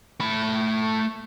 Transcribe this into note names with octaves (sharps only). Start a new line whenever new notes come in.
A3 B5